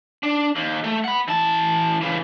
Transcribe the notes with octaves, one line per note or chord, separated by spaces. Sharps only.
D4
D#2
A3
F#5 B5
E3 A5
C#3 E3